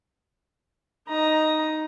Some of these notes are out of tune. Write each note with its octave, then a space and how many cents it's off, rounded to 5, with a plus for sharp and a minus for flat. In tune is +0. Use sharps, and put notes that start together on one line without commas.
D#4 +0 A#5 +10